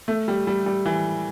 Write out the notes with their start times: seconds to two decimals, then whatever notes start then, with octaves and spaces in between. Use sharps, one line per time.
0.08 A3
0.28 G3
0.47 G3
0.66 G3
0.86 E3